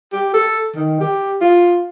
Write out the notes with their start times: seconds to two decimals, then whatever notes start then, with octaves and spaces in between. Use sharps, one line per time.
0.12 G4
0.34 A4
0.76 D#3
1.01 G4
1.41 F4